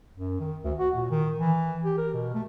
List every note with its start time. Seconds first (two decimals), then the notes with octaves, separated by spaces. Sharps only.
0.17 F#2
0.40 D#3
0.64 D2
0.79 F#4
0.96 A#2
1.11 D#3
1.39 E3
1.84 G4
1.98 A#4
2.14 B2
2.34 A3